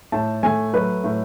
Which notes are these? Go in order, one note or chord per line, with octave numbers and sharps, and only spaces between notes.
A2 A5
A3 G#5
F#3 B4
A2